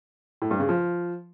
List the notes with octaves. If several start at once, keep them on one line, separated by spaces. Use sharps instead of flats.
A2
G2
C#3
F3